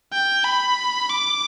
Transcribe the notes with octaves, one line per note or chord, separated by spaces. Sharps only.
G5
B5
D6